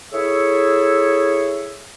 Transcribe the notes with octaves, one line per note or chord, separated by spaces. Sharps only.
E4 G#4 A4 C#5 E5